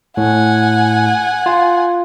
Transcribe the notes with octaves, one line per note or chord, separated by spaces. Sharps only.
A2 F#5 G#5
F4